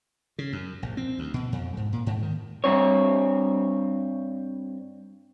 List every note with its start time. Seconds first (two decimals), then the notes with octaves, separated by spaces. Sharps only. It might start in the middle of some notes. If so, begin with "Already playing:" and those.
0.39 C#3
0.53 F#2
0.82 A#1
0.97 C4
1.19 D2
1.34 B2
1.52 F2
1.77 G#2
1.93 A#2
2.06 G#2
2.22 D#3
2.64 G2 C4 C#5